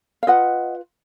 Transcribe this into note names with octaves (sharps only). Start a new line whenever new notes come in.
F5
F4 B4 D#5 F#5